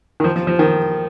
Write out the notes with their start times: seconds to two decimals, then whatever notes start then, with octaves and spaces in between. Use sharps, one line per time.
0.20 D#3
0.24 F3
0.36 F3
0.47 F3
0.59 D#3